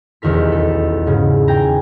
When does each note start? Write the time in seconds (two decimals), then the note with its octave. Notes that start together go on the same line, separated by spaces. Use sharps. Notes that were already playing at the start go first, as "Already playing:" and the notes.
0.22 D#1 B1 E2 D#3 A#4 B6
0.52 A4
1.06 G#2 C#3
1.48 G5 G#5 A#5 A#6